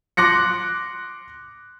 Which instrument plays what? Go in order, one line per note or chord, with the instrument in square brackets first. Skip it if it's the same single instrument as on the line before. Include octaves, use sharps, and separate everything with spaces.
[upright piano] C6 D6 F#6 A#6 C#7